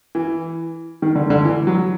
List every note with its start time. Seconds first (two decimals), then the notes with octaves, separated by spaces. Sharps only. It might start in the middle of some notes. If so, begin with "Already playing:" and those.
0.15 E3
1.02 D#3
1.15 D3
1.30 D3
1.44 E3
1.67 F#3